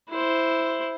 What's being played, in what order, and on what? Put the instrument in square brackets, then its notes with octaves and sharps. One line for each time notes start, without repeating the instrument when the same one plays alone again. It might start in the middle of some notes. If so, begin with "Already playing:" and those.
[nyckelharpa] E4 C5